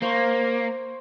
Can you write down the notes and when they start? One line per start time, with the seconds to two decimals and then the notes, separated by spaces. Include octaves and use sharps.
0.02 A#3 C5 A#5 C#6